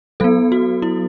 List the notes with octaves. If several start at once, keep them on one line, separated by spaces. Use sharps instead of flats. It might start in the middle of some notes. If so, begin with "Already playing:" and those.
F#3 B3 A4
F#4
E4